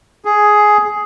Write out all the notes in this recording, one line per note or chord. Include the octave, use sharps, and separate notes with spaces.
G#4